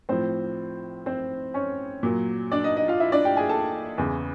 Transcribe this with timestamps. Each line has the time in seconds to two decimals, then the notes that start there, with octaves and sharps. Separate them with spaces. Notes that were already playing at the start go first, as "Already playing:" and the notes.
0.09 A2 F3 C4 C5
1.06 C4 C5
1.54 C#4 C#5
2.03 A#2 F#3
2.52 D4 D5
2.64 D#4 D#5
2.76 D#4 D#5
2.88 F4 F5
3.00 E4 E5
3.12 D4 D5
3.25 G4 G5
3.37 G#4 G#5
3.49 A4 A5
3.98 E2 C#3 E3